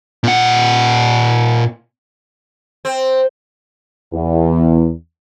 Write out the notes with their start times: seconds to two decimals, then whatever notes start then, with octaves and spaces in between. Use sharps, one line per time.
0.24 A#2 F#5
2.85 C4
4.12 E2